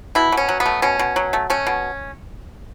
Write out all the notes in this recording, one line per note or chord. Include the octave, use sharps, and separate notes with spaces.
B2 E4
B2
C#4
F#3
B3
A3
B2 C#4
B2
F#3
A3
A3 C#4
B2